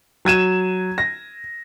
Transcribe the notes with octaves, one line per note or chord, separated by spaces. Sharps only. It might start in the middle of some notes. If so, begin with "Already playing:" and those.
F#3 G#6 D#7 E7
A#6